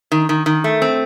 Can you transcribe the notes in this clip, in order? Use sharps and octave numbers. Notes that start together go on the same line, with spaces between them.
D#3
D#3
D#3
A3
C4